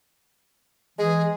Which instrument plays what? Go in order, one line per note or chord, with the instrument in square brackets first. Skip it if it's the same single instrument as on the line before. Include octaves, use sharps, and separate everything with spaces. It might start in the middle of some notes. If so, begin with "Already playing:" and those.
[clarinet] E3 [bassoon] G#3 [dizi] G#4